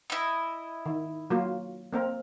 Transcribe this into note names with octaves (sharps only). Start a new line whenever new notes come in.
E4 D#5
D#3
F#3 A#3 F4
A#3 C4 A#4